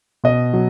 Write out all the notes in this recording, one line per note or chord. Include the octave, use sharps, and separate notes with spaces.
B2 D#5
F#3